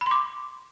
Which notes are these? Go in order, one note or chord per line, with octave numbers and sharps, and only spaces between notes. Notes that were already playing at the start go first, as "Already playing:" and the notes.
B5
C6
D6